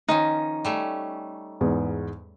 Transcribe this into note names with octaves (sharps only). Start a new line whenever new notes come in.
D#3 F3 C#4 D#4
G3 A3 C#4
E2 G#2 B3